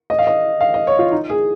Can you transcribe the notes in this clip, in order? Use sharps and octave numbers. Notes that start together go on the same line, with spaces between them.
D#5
F5
D#5
F5
D#5
C#5
F4
D#4
G#4